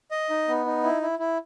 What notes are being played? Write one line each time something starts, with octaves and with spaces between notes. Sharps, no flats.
D#5
D#4
B3
D#4
E4
E4
E4